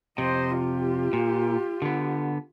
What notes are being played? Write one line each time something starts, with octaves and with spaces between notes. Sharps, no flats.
F2 C3 C5 D#5
F4 G4
A#2
D3 B3